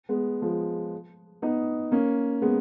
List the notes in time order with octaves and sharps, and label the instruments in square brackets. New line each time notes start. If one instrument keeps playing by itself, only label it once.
[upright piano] G#3 B3
F3 G#3
B3 D#4
A#3 C#4
G#3 B3